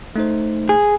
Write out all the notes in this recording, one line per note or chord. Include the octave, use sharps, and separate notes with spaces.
A3 D#4 C5
G#4